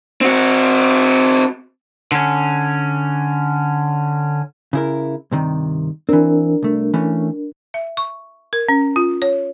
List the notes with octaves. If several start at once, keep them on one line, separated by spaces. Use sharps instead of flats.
C4 F#4
D3 C#4
C#3 E4 A#4
G2 C3 D#3
E3 C4 D4 A#4
C2 A3
E3 A3 C#4
E5
C#6
A#4
C#4
F4
C#5